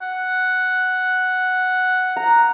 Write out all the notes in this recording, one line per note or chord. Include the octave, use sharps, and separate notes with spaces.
F#5
A#5